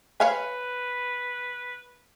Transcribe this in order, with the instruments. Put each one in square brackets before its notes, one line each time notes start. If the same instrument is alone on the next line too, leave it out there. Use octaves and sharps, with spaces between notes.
[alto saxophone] B4 [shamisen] C#5 F5 G#5